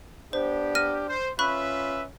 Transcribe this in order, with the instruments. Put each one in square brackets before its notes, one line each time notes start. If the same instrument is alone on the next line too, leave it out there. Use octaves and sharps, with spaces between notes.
[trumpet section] B3 G4 [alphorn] D4 [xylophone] C5
[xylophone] F6 A#6 D#7
[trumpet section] C5
[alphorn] C#4 [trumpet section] F4 B4 E5 [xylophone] B5 C#6 F#6